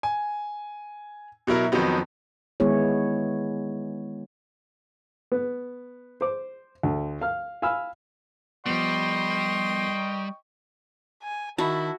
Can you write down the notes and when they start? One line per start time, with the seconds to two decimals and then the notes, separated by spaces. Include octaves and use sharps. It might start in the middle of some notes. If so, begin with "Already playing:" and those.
0.03 G#5
1.47 B2 F#3 E4 A#4
1.72 F2 D#3 F3 F#3 B3
2.60 D#3 G#3 B3 E4 G#4 C#5
5.32 B3
6.21 C5 D6
6.83 D2
7.21 F5 F6
7.62 F5 G#5 B5 E6 F6
8.66 F3 G3 B3 D#5 G5 C6 C#6
11.23 G#5
11.58 D#3 E4 F#4 A5 B5